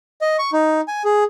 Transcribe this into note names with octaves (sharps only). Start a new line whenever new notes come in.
D#5
C#6
D#4
G#5
G#4